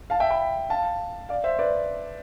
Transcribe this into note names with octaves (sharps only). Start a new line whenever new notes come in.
F5 A5
E5 G5
G5 B5
F5 A5
D5 F5
C5 E5
B4 D5